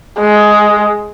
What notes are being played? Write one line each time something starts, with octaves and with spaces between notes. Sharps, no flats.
G#3